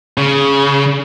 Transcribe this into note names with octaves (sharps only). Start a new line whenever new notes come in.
C#3